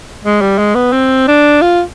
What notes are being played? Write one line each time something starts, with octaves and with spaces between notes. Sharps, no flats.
G#3
G3
G#3
B3
C4
D4
F4